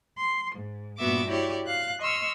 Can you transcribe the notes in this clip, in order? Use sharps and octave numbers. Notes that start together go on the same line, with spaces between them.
C6
G#2
G2 A#2 B3 F#4 E5 D6
E4 F#4 G4 C#5 D5
F5 F#6
D#5 C6 C#6 E6 F6